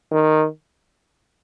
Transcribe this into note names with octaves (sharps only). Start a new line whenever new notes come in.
D#3